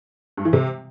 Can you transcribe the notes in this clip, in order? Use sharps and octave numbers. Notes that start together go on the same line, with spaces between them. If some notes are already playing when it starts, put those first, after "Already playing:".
G2
E3
C3